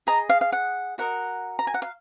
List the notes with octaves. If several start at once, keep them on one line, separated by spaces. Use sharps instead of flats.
G#4 D#5 A#5
F5
F5
F#5
F#4 A#4 D#5 F#5
A#5
G#5
F#5
F5